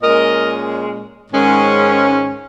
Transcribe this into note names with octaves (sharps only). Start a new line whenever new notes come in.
A#2 G#3 C#4 A#4 D#5
G#2 D#3 G#3 C#4